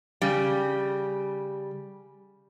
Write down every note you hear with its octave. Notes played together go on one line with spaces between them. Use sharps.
C#3 G3